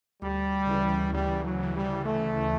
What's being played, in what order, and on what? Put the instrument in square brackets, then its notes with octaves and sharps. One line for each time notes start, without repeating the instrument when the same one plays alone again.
[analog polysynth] D2 [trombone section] G3
[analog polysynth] C#3 E3
[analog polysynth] D2 [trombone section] G3
[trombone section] F#3
[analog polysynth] C#3 E3
[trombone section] G3
[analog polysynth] D2 [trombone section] A3